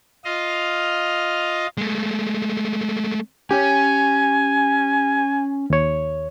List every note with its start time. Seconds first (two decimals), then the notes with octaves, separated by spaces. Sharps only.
0.25 F4 D#5 F5
1.78 G#3 A3
3.51 C#4 G4 C#5 G#5
5.70 D#2 C#5